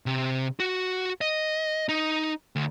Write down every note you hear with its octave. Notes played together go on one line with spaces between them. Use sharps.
C3
F#4
D#5
D#4
D2